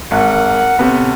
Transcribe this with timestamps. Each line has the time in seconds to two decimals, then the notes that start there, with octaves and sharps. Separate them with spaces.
0.11 G#1 A#4 F#5
0.79 A2 C3 B3 C#4 A4